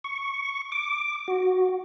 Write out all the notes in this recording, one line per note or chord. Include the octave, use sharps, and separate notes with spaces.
C#6
D6
F#4